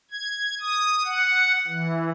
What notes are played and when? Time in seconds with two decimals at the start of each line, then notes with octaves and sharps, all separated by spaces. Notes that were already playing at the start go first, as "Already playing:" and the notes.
0.11 G#6
0.61 D#6
1.05 F#5
1.67 E3